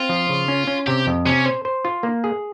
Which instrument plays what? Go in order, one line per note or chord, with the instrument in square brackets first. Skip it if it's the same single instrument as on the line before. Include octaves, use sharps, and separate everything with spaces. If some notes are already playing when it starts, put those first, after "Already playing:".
Already playing: [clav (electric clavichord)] C4 [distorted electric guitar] F4
[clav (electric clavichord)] F3
C#3
C#4
C#4
[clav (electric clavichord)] C3 [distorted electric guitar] G4
[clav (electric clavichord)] F2
[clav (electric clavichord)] C3 [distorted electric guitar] C#4
[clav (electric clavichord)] C5
C5
F4
A#3
G#4